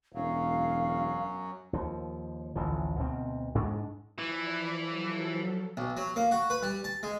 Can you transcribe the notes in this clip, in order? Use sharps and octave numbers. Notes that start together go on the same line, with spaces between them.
E1 F#2 F#3 F5
D#2 F3
A1 D2 E3 F3
D2 B2 C4
G#2 G#3 D4
E3 F3 D5 B5
F3 F#3 A4
B1
F#3
A#3
F#4
B4
G3
A5
G#3